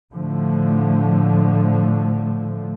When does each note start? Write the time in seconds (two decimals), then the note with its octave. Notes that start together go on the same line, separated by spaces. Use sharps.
0.14 A2 D3 F3 A3